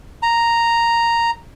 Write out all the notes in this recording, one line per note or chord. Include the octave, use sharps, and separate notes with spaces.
A#5